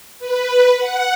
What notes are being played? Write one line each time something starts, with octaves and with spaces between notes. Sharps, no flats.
B4
F#5